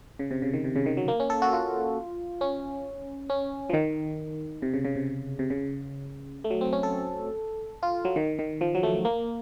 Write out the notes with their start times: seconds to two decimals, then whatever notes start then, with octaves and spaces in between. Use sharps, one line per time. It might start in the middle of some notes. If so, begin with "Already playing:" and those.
0.19 C#3
0.31 C3
0.42 C#3
0.54 D#3
0.64 C3
0.76 C#3
0.86 D#3
0.97 F#3
1.08 A#3
1.20 C#4
1.30 A4
1.42 F#4
1.53 F4
2.41 C#4
3.30 C#4
3.70 F3
3.73 D#3
4.62 C3
4.74 C#3
4.85 C#3
4.96 C3
5.39 C3
5.50 C#3
6.44 A3
6.50 F#3
6.61 C4
6.73 C#4
6.83 A4
7.83 F4
8.05 F#3
8.16 D#3
8.39 D#3
8.61 F3
8.75 F#3
8.83 A3
9.05 A#3